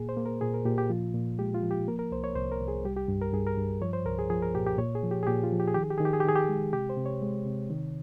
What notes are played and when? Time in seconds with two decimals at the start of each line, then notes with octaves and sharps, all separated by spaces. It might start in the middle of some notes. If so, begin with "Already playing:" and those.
Already playing: A#2 A#3 G#4
0.09 C5
0.17 A#3
0.26 A#4
0.41 A#2 G#4
0.54 A#4
0.66 A#2 G4
0.78 G4
0.90 F3 F4
1.14 A#2
1.39 G#3 G4
1.54 F4
1.63 F3
1.71 G4
1.88 A#3 A#4
1.99 A#4
2.11 C2 C5
2.24 C#5
2.35 C2 C5
2.52 A#4
2.60 C2
2.68 G#4
2.84 G3 G4
2.96 G4
3.08 G2
3.22 A#4
3.33 G2 G#4
3.47 A#4
3.58 G2
3.82 F3 C#5
3.93 C5
4.06 C2 A#4
4.19 G#4
4.30 F3 G#4
4.42 A#4
4.55 A#2 G4
4.67 G4
4.78 A#2 C#5
4.95 G#4
5.03 F3
5.11 G4
5.23 G#4
5.27 A#2 G4
5.43 F4
5.52 F3
5.60 G4
5.67 G#4
5.74 D#3 G4
5.83 G#4
5.91 G4
5.98 D#3 G#4
6.05 G4
6.13 G#4
6.20 G4
6.25 D#3 G#4
6.36 G4
6.49 G#3
6.73 C3 G4
6.90 C5
6.97 C3
7.06 C#5
7.22 G#3
7.46 C3
7.70 D#3